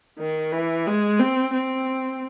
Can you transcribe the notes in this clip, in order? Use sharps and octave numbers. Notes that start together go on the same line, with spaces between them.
D#3
E3
G#3
C4
C4